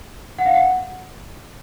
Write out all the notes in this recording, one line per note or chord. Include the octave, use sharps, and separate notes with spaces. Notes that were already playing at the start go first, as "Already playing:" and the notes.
F#5
F5
F#5